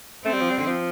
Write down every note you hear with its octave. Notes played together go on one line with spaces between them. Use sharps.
A3 C4
G3
F3
G3
D3
F3